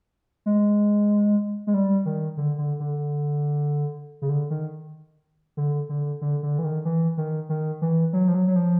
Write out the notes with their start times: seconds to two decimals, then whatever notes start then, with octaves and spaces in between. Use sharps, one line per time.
0.46 G#3
1.67 G#3
1.74 G3
2.06 D#3
2.37 D3
2.58 D3
2.80 D3
4.22 C#3
4.29 D3
4.50 D#3
5.57 D3
5.89 D3
6.21 D3
6.43 D3
6.59 E3
6.64 D#3
6.85 E3
7.17 D#3
7.49 D#3
7.82 E3
8.13 F#3
8.28 F3
8.35 F#3
8.47 F#3
8.56 F3